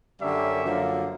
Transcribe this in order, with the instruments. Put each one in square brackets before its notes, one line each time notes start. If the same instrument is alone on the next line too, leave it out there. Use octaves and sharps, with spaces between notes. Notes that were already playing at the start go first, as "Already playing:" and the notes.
[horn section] F#2 D3 G3 A#3 C#4 E5
F#2 D3 F3 A#3